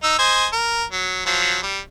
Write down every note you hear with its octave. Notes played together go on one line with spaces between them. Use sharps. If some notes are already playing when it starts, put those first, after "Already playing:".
D#4 E6
C5 D#5 G#5
A#4
F#3
F3 F#3
G3